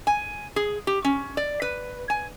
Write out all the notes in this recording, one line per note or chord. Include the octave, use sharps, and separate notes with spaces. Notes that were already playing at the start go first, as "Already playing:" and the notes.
G#5
G#4
G4
C#4
D5
B4
G#5